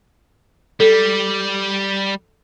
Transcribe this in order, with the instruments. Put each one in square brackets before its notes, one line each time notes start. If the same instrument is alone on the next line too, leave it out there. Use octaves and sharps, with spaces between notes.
[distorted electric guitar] G3 [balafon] A4